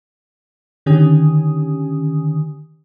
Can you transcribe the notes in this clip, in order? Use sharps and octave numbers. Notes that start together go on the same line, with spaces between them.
D3 D#3 C#4 G4 G#5 D#6